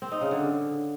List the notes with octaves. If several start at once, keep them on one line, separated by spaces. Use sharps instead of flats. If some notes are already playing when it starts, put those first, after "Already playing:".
C4
D#4
C#3
D3